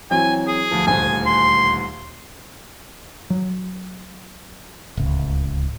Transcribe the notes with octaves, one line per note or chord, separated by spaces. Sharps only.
E3 F#3 C4 G#5
G#4
D2 F3
D#1 D2 C5 G#5
C6
F#3
D1 C#2